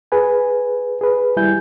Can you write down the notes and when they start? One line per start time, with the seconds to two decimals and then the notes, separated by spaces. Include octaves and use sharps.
0.12 G#4 B4 G#5
1.01 G#4 B4
1.36 D#2 G3 E4 G#5 G6